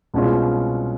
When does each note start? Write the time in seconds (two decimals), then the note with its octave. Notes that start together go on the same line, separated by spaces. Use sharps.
0.14 C2 B2 G#3 C#4 F4